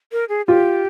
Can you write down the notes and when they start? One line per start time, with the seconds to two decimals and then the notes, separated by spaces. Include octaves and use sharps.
0.12 A#4
0.29 G#4
0.47 F4 G4